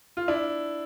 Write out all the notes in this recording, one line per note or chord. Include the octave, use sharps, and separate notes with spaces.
F4
D4 E4